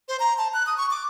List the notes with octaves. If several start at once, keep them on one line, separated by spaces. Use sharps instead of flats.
C5
A#5
A5
F#6
D#6
C#6
D6